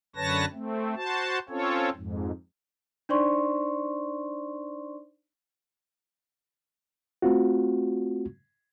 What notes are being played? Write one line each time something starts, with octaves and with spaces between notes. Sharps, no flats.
F#2 D3 B4 C#5 A5 A#6
A3 C4
F#4 C5 A5
C4 C#4 F4 A4 C#5
F2 G#2
D4 D#4 C5 D5 C6 C#6
A3 C4 F4 F#4